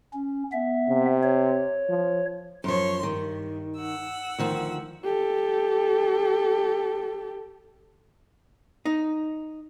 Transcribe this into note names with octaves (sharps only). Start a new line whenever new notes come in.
C#4
B3 E5
C3
C#5
F3
F#2 F3 C#5 C6
G2 D#3
F#5 E6
D2 D#3 F3
G4 A4
D#4